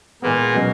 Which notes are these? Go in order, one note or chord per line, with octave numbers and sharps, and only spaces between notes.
A#2 E3 G#3 A#3 B3
B2 F#3 C#4 F#4